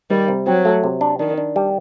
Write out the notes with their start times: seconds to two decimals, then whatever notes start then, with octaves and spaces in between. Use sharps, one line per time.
0.10 D#3 G3
0.28 C3
0.47 F#3 C4
0.65 A3
0.84 C3
1.01 D4
1.19 D#3 D4
1.38 D4
1.56 G3